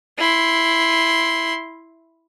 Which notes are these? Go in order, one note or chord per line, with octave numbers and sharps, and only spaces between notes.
E4 C6